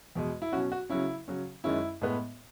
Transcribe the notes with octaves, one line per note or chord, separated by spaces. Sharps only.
E2 B2 G#3
E4
B2 F#3 C#4 F#4
F#4
C#3 F#3 C#4 E4
C#3 F#3 C#4
F#2 D#3 G#3 C#4 E4
A2 G#3 B3